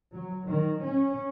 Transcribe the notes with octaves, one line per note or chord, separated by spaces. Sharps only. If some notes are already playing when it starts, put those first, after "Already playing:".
F#3
D#3
C#4